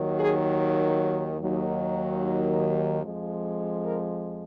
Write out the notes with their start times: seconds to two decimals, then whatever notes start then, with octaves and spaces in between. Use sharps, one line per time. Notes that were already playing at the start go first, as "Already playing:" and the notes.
Already playing: D#2 D#3 F#3
0.19 G#4
1.41 D#2 D#3 F#3
3.04 F2 F3 G#3
3.84 A#4